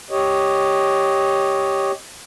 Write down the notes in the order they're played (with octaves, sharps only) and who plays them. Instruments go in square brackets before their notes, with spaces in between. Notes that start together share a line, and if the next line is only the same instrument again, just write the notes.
[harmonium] G4 C#5 D#5